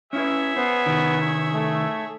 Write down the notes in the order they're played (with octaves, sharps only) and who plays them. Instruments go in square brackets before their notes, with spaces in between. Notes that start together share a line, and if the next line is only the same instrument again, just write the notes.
[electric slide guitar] C#4 E4 B4 [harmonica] G#4 C#5 E5
[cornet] B3 [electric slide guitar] C5
[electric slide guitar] C3 D#3
[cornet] A3